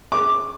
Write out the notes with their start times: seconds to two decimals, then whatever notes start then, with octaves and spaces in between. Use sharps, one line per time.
0.12 D6